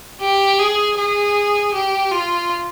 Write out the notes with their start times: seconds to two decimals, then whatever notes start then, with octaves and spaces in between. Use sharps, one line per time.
0.21 G4
0.59 G#4
0.97 G#4
1.73 G4
2.12 F4